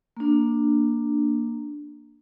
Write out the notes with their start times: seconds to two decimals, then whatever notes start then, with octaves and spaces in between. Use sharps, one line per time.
0.17 A#3 D4